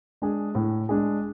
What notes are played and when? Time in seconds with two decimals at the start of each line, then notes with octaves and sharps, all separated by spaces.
0.22 G#3 D4 G#4
0.55 A2
0.89 G#3 D4 G#4